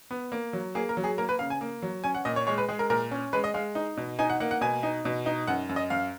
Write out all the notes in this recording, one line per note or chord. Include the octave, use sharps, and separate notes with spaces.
B3
A#3
F#3
A#3 G#4
A#4
F#3
G#4
A#3 A#4
B4
C#3 F5
G#5
A#3
F#3
C#4 G#5
F#5
A#2 D#5
C#5
G#3 C#5
B4
G#3 G#4
A#4
A#2 A#4
C#4
G#3 B4
D#5
G#3 F5
D#4
B2
D#4 G#5
F#5
A#3 F#5
F#5
B2 G#5
D#4
B2
D#4
F#2 F#5
F#2
D#5
F#2 F5